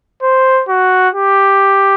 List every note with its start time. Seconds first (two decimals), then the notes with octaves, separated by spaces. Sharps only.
0.23 C5
0.69 F#4
1.14 G4